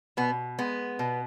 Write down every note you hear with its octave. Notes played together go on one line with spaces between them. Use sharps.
B2 B3
G#3 B3
B2